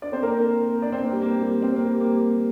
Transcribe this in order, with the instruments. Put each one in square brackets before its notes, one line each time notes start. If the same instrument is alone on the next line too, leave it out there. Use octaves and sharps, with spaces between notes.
[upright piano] D4 D5
C4 C5
A#3 A#4
D4 D5
C4 C5
A#3
G3
A#3
G3
C4
A#3
G3
A#3